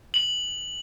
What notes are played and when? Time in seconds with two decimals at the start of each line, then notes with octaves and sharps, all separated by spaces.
0.14 F#7